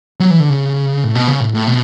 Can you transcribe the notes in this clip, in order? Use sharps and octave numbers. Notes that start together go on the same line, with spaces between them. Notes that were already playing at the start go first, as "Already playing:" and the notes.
F#3
E3
D3
C#3
A2
B2
C#3
A2
A2
B2